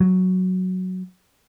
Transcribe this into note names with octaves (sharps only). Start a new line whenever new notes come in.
F#3